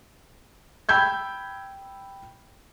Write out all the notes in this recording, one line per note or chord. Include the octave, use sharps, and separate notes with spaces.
G5 B5 E6 G6 G#6